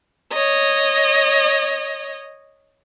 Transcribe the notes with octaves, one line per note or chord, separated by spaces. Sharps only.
C#5 D#5